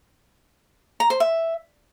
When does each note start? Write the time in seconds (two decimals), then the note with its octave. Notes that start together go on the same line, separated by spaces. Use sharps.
1.00 A#5
1.10 C5
1.20 E5